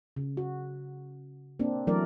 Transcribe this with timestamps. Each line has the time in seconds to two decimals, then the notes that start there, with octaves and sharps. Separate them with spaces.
0.16 C#3
0.37 F#4
1.59 A#3 C4 D4
1.87 E3 F#3 A3 D4 A#4 D5